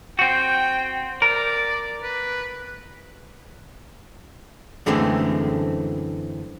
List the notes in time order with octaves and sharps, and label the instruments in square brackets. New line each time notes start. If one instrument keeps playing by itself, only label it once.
[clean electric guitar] C4 F#4 [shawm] G5
[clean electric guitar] A#4 [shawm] D5
[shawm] B4
[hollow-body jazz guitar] F#2 D3 E3 G#3 A3 C4